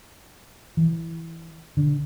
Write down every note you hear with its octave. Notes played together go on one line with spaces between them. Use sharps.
E3
D3